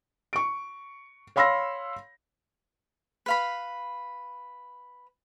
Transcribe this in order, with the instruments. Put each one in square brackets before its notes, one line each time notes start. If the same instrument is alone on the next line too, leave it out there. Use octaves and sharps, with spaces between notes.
[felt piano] C#6 D7
C#5 F5 B5 C6 E6 A#6
[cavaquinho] B4 F5 B5